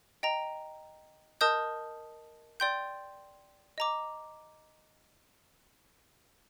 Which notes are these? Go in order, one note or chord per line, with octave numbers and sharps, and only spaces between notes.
D#5 G5 A#5
A#4 D#5 A5 D#6 G6
D5 G5 C6 G6
D#5 A#5 D6